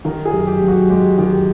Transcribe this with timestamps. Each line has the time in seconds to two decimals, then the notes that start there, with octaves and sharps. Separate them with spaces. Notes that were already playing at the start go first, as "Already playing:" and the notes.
0.05 D#3 A#4
0.25 G#4
0.33 F#2
0.47 G4
0.62 F#2
0.68 F#4
0.90 G#3 G4
1.18 D#3 G4